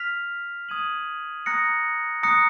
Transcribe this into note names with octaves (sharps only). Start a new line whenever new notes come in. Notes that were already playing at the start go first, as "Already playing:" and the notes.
Already playing: F6 B6 F7
D#6 G#6 D#7 F#7
A#5 D#6 F#6 A#6 C#7
A#5 D#6 F#6 A#6 C#7